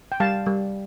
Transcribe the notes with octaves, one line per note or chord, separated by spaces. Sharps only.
G5
G3 F5 A5
G3